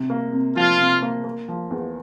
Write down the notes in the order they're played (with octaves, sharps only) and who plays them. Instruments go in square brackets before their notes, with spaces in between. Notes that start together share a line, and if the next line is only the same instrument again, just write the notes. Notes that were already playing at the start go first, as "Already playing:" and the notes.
Already playing: [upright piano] C3
A#3
C3
[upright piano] F3 [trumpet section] F4
[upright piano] C3
A#3
A#3
F3
E2